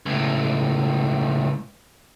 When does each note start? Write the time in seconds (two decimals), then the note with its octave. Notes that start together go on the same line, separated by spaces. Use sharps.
0.06 C#2 A2